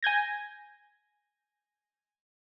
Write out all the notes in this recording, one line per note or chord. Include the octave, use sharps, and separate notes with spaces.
G#5 G6 G#6 A#6